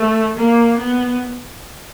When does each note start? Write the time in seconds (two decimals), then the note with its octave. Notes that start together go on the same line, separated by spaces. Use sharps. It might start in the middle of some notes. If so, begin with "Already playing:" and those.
Already playing: A3
0.37 A#3
0.78 B3